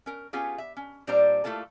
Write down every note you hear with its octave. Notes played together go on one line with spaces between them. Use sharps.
C#4 A#4
B3 C#4 F4 G4 G#4
E5
C#4
A#2 G3 D4 C5 D5 A#5
A3 A#3 E4 F4 A4